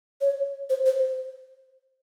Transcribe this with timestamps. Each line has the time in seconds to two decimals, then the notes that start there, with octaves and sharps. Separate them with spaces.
0.21 C#5
0.70 C5
0.86 C5